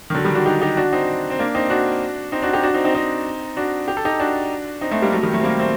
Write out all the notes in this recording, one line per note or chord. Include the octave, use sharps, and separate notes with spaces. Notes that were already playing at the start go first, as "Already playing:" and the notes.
D#3
D3 F#3
D#3 G3
D4 F#4
D#4 G4
D#4 G4
D4 F#4
C4 D#4
C4
A#3 D4
C4 D#4
D4 F#4
C4 D#4
D4 F#4
D#4 G4
D4 F#4
C4 D#4
C4 D#4
C4 D#4
D4 F#4
G4
A4
D#4 G4
D4 F#4
C4 D#4
A3 C4
G3 A#3
F#3 A3
D#3 G3
F#3 A3
C4
G3 A#3
A3 C4